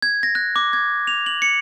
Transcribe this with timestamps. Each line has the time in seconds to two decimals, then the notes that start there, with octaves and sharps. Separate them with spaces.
0.02 G#6
0.23 A#6
0.35 F#6
0.56 D6
0.73 G#6
1.07 F7
1.26 F#7
1.42 C#7